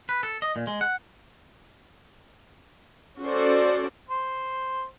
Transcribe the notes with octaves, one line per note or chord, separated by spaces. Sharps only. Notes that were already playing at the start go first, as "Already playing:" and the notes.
B4
A4
D#5
A#2
G#3
F#5
C#4 F#4 A4 C5 D5
C5